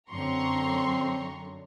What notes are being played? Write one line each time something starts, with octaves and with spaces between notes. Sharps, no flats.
F#2 D3 F#3 C4 A#5 C6 C#6